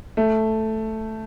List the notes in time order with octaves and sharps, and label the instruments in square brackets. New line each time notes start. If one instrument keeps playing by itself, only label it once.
[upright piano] A3